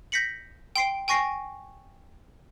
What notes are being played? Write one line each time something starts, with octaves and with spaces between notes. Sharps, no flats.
G6 A#6 B6 C#7 F#7
G5 C6 C7 D7
G5 G#5 C#6 A#6 C7